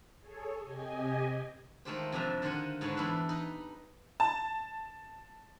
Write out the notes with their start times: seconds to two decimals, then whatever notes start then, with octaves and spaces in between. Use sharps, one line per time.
0.20 G#4 A4 C#5
0.60 C3 G4 D#5 G#5
1.85 D#3 G#3 A3 F4 G4 C5
2.12 F2 C3 D4 E5 A#5
2.42 D3 D#3 F4 C5 F#5 G#5
2.81 G#2 D3 G#3 B4 C#5 A5
2.97 E2 G3 D4 E4 A4 B4
3.29 D#4 B4
4.20 A5